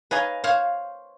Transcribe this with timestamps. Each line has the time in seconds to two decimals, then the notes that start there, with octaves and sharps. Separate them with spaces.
0.11 B4 C#5 D#5 F5 G#5 A#5
0.44 C5 C#5 F5